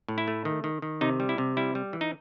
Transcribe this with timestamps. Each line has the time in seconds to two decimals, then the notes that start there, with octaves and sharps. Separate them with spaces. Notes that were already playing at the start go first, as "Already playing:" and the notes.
0.08 A2
0.18 E4
0.28 A3
0.45 D#3
0.64 D#3
0.82 D#3
1.01 C3 D#4
1.20 G3
1.29 E4
1.38 C3
1.57 G3 E4
1.75 G3
1.93 E3
2.01 D#4